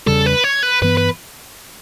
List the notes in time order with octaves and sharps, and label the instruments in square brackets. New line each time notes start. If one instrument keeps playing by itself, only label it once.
[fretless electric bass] E2 C#3 G3 [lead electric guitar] A4
[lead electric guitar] B4
C#5
B4
[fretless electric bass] G2 E3 B3 [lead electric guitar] B4
[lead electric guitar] B4